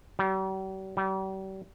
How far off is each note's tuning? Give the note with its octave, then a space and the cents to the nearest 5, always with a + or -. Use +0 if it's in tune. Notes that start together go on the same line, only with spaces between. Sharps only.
G3 -45
G3 -40